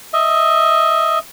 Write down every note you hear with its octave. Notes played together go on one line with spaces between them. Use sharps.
D#5 E5